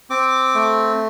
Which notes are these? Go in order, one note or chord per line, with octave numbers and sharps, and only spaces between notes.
C4 D6
A3